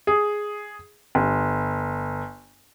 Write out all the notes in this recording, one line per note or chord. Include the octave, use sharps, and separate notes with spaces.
G#4
G1